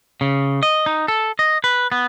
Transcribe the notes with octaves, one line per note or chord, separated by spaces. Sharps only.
C#3
D#5
D#4
A4
D#5
B4
B3